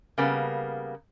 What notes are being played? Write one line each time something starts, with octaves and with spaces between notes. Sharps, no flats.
C#3 G3 A#3 B3